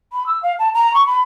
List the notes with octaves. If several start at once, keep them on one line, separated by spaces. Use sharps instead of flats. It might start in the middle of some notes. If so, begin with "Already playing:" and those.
B5
E6
F5
A5
A#5
C#6
B5